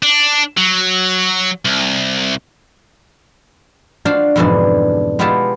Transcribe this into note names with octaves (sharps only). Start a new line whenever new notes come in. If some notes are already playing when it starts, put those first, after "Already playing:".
D4
F#3
C2
D4 F4 F#4 C5 F5
F2 G#2 B2 D3 E3 D4
G#3 B3 E4 F4 G4 A5